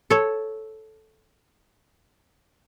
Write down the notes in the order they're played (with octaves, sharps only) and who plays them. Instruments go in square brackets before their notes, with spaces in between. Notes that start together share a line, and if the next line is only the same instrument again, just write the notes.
[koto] A4 C#5